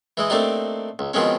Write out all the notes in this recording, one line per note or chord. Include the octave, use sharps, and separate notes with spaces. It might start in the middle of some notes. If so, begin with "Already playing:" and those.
E3 G#3 D#5
A3 A#3 C4 D4 D#4 G4
C#2
B2 D#3 F3 G#3 C4 C#4